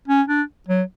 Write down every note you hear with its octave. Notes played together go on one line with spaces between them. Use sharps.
C#4
D4
F#3